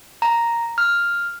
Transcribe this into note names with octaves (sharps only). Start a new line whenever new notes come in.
A#5
F6